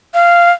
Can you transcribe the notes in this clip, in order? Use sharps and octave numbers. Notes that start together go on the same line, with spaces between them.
F5